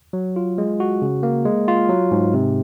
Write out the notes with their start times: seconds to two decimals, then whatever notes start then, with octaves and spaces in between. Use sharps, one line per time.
0.13 F#3
0.36 F4
0.58 G#3
0.80 F#4
1.02 C#3
1.23 A#3
1.45 G#3
1.68 F4
1.89 F#3
2.11 G#2
2.34 C3